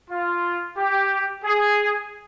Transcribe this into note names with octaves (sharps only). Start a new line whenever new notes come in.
F4
G4
G#4